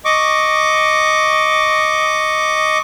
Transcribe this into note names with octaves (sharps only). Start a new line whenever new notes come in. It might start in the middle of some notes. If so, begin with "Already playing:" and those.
D#5 C#6 D6